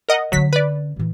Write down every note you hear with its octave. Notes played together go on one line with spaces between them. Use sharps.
A#4 D#5 F#5
D3 F#3 C#4 B6
B4 D5
A2 E3